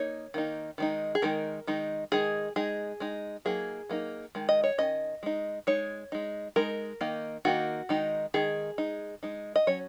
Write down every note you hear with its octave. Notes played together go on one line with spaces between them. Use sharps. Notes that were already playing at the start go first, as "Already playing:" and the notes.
Already playing: A#3 D#4 C#5
D#3 A#3 D#4
D#3 G#3 D#4
G#4
D#3 G#3 D#4 A#4
D#3 G#3 D#4
D#3 G#3 D#4 G#4
G#3 D#4 G#4
G#3 D#4
F#3 A#3 D#4 G#4
F#3 A#3 D#4
D#3 G#3
D#5
C#5
D#3 G#3 C#4 D#5
G#3 D#4
G#3 D#4 C#5
G#3 D#4
G#3 D#4 A#4
D#3 A#3 D#4
D#3 A#3 D#4 F#4
D#3 G#3 D#4
D#3 G#3 D#4 G#4
G#3 D#4
G#3 D#4
D#5
F#3 C#4 C#5